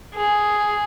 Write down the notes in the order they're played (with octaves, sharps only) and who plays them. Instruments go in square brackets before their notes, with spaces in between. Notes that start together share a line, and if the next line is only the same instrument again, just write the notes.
[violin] G#4